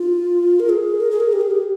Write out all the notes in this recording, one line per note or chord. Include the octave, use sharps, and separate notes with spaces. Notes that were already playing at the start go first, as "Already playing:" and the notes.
Already playing: F4
A#4
G#4
A#4
G#4
A#4
G4
G#4
G4